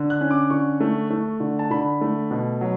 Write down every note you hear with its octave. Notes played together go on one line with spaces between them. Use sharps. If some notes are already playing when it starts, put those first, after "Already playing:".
Already playing: D3
F#6
C#4
D6
D3 C#6
A3
A3
D3
A5
D3 B5
A3
B2
F#3